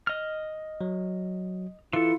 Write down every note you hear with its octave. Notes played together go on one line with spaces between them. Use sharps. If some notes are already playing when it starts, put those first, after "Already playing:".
D#5 F6
F#3
E3 E4 F4 A4